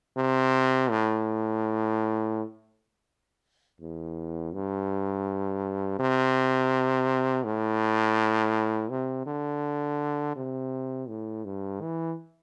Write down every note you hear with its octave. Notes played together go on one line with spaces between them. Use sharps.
C3
A2
E2
G2
C3
A2
C3
D3
C3
A2
G2
E3